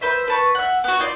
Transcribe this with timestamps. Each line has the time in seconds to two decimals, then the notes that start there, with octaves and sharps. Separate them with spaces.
0.01 B4 C5 E5
0.28 B4 A5 C#6
0.55 E5 F#5
0.84 B3 F#4
0.99 D#4 F4 C#5 D5